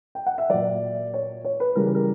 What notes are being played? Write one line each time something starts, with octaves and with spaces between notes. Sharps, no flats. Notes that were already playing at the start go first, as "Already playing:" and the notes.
G5
F#5
E5
A#2 F#3 D5
C#5
C#5
B4
C#3 E3 G3 A#4
G4
A#4